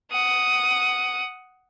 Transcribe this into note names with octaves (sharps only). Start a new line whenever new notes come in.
F#5 D#6